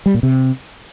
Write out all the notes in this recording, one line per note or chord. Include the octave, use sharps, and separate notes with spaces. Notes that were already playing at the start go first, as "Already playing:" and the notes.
G3
A#2
C3